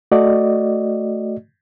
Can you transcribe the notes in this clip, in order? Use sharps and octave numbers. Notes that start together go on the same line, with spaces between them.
A3 F#4 D5 D#5